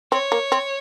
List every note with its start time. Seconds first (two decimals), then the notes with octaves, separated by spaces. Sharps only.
0.12 C4 C#5
0.32 A#3
0.52 C4